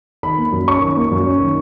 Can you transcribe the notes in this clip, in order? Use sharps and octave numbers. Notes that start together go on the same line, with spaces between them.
D#3 B5
A#3
F#2
C#4 C#6
D#3
A#3
F#2
C#4
D#3